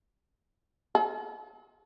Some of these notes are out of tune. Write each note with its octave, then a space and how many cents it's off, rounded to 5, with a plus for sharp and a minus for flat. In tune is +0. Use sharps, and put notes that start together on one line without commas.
A4 -45